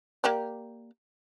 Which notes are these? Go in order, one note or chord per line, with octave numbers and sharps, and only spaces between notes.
A#3 G4 D5